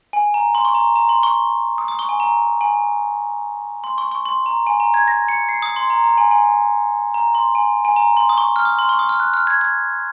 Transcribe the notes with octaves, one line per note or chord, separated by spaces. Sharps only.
G#5
A#5
C6
C#6
A#5
A#5
C6
C#6
D#6
D#6
C#6
G#5
A#5
G#5
C6
C#6
C#6
C6
A#5
G#5
A#5
G#6
A#6
C#7
C7
D#6
C6
A#5
A#5
G#5
G#5
A#5
C6
G#5
G#5
A#5
C6
D#6
C#6
F6
D#6
C6
C#6
D#6
F6
F#6
F6
G#6
G#6